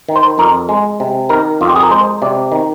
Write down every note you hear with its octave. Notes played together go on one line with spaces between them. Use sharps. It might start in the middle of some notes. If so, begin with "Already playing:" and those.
D#3
C5
F2 A#4
G#3
C3
D#3 A#4
F2 F4
G4
G#4
A#4
G#3 C5
C3 D5
D#3